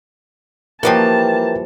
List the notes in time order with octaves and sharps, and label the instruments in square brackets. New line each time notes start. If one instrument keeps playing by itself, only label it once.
[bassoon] E3 [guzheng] F3 G3 F#4 [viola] A#3 A5 [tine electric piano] A#4 G5